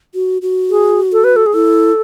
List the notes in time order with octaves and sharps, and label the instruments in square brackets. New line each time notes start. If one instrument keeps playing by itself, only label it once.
[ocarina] F#4
F#4
[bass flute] G#4
A4
B4
A4
G#4
[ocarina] E4 [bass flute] A4